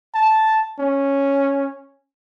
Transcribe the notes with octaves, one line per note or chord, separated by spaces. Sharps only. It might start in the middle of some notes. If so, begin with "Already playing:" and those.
A5
C#4